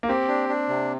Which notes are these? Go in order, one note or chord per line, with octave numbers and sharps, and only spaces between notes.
A#3
C4 G4
D4
D4
C3